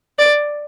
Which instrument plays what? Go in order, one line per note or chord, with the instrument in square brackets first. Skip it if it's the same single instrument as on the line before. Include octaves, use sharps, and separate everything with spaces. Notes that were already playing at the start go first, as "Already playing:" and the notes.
[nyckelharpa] D5